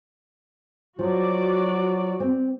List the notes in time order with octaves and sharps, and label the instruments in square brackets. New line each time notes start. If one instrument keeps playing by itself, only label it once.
[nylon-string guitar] F3 [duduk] F#3 [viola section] F#4 D5
[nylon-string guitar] C4